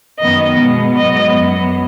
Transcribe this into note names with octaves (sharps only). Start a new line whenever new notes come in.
F#2 D#3 B3 D#5
B2 G#3 B3
G#2 F#3 B3 D#5
F#2 F#3 B3